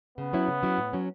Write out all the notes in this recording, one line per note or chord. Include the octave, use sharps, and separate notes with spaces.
C#3 B3
F#3 C#4 E4
C#3
F#3 C#4 E4
A2
F#3 C#4